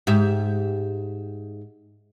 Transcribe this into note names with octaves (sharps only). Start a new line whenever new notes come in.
G#2 G4 E5